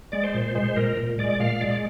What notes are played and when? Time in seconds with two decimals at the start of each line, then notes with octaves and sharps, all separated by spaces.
0.12 G#3 D5
0.24 C5
0.34 A#2
0.55 G#3 C5
0.76 A#2 A#4
0.97 A#2
1.18 G#3 D5
1.40 A#2 F5
1.61 G#3 D5